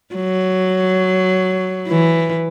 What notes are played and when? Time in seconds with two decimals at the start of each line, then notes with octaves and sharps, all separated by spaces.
0.15 F#3
1.88 E3